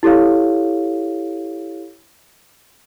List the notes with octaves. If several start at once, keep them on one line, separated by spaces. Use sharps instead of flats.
E4 G4 A4 C#5 F5